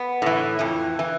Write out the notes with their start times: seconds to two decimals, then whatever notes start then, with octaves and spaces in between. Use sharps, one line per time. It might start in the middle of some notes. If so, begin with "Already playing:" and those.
Already playing: B3
0.22 A2 E3
0.59 F2 E3
0.99 E3